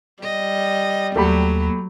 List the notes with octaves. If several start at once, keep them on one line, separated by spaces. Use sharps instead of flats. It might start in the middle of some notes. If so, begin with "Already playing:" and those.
G3 D#5
D#2 F#3 A3 G4 B5